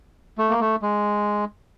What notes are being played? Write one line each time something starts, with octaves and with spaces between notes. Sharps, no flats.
A3
A#3
A3
G#3